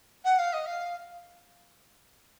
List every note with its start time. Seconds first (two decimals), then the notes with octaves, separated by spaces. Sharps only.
0.24 F#5
0.38 F5
0.53 D#5
0.66 F5